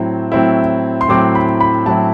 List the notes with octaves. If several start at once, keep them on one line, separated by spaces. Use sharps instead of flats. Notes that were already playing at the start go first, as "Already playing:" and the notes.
Already playing: A2 F#3 C4 E4
A2 F#3 C4 E4
C6
A2 F#3 C4 E4 D6
B5
B5
A2 F#3 C4 E4 A5